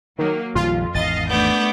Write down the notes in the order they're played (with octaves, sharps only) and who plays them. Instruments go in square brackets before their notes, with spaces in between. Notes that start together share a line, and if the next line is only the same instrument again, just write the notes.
[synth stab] D#3 [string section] F#3 A#3
[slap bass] A#1 D#3 G3 [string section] F2 [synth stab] F4
[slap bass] G#1 E2 D#3 [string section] D#5 F5 [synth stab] A6
[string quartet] A3 B3 D4 [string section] D6 G6